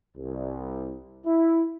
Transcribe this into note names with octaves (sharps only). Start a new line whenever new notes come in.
C2
E4